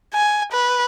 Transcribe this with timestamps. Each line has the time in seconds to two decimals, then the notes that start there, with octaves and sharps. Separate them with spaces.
0.14 G#5
0.52 B4